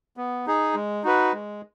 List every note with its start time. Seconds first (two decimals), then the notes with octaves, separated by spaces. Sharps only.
0.17 B3
0.47 D#4 G#4
0.74 G#3
1.03 D#4 F#4 B4
1.33 G#3